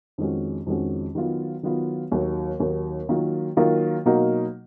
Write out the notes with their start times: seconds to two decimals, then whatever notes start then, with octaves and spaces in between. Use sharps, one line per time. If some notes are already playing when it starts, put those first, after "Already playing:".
0.18 F2 D#3 G#3 C#4 F#4
0.66 F2 D#3 G#3 C#4 F#4
1.15 D#3 F#3 B3 F4
1.63 D#3 F#3 B3 F4
2.12 D#2 D#3 F#3
2.60 D#2 D#3 F#3
3.09 D#3 F#3 A#3 F4
3.57 D#3 F#3 A#3 F4
4.05 B2 F#3 A#3 D#4 F#4